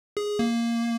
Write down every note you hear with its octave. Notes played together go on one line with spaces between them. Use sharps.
G#4
A#3